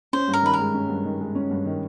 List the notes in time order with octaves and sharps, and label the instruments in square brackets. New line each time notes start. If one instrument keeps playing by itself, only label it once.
[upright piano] C#4 [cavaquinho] C5
[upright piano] G2
[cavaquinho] A#4
[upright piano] D#3 [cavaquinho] B4
[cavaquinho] A#4
[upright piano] G#3
C#4
G2
D#3
G#3
C#4
G2
D#3